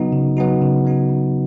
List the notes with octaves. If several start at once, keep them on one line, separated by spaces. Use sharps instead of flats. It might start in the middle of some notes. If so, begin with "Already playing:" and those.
Already playing: C#3 F#3 B3 D#4 F#4
C#3
F#3 B3 D#4 F#4
C#3
F#3 B3 D#4 F#4
C#3